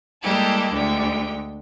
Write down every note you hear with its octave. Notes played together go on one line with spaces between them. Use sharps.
G3 G#3 A#3 E4 G4 A4
D2 D3 G#3 G5